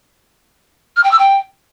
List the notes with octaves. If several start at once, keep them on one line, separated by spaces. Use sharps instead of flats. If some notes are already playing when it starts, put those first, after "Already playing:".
F6
G5
E6
G5